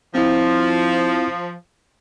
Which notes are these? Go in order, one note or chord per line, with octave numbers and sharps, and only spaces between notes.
F3 C4 E4